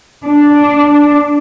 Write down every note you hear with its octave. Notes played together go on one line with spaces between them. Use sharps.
D4